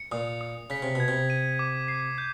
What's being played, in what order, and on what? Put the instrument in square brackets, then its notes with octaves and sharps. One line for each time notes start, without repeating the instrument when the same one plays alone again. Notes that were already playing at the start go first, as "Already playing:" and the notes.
Already playing: [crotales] C#7
[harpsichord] A#2 [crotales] D#6
[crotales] D#6
[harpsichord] C#3 [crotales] B6
[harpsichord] C3
[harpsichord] B2 [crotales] G#6
[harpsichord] C3
[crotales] D#7
D6
C7
G6